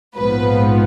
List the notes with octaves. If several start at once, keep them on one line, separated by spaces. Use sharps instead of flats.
A#1 G#2 F3 B3 B4